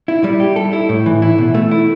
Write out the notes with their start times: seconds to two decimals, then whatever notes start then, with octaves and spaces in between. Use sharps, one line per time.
0.08 E4
0.24 G3
0.40 G4
0.56 A4
0.73 E4
0.89 A2
1.06 E3
1.22 E4
1.38 B2
1.55 A3
1.71 E4